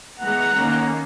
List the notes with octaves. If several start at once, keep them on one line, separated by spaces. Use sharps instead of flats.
E3 G#3 B3 F#5 A#5
D#3 A#3 C#4